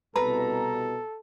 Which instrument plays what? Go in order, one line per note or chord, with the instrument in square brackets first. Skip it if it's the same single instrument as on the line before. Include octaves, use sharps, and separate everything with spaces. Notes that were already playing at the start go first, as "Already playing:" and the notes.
[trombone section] C2 B2 [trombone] A4 [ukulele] B4 [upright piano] A#5